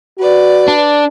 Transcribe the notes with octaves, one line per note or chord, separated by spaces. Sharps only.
F#4 B4 D5
D4